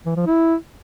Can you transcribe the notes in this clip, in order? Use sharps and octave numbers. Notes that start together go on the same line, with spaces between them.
E3
F3
E4